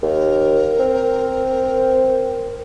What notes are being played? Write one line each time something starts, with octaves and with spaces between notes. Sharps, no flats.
D#2 A#4
C4